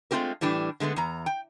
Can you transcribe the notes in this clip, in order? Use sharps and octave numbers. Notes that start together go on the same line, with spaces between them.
G#3 A3 C4 F4 G4 A#4
A2 E3 G3 D4
D3 G#3 A3 B3
E2 A#5
G5